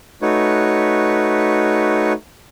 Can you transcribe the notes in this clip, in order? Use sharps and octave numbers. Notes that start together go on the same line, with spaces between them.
A3 D#4 F#4 B4 C#5